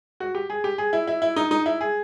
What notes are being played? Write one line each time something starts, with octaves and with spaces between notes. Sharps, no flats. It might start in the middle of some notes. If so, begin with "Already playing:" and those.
F#4
G4
G#4
G4
G#4
E4
E4
E4
D#4
D#4
E4
G#4